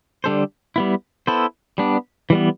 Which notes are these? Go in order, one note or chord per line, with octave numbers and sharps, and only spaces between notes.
D3 G3 D4 A4 C5
G3 B3 E4
B3 E4 A4 C5
G3 B3 D4
E3 G3 B3